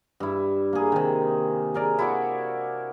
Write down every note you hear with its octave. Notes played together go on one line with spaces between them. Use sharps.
G2 E4
A#3 G#4
C3 D#3
G#4 A#4 D5
E4 F#4 D5